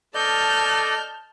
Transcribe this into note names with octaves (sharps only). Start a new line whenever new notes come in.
A4 D5 D#5 A5 F6 G6